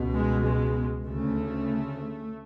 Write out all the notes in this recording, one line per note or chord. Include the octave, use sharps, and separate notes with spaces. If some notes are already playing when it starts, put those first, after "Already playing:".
Already playing: C#2 B2
G#3
G#3
D2 C#3 A3